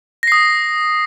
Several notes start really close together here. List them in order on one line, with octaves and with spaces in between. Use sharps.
A#6 C7 D#6